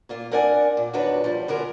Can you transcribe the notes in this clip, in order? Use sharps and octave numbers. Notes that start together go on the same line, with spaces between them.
A#2 A#3 F4
C4 D4 A#4 D5 F#5 G#5
A#2
E2 D#3 D4 F#4 B4 C#5
F3 G3
D3 D#3 B3 F#4 G#4 A#4